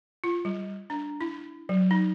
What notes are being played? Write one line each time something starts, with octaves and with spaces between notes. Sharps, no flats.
F4
G3
D4
E4
F#3
D#4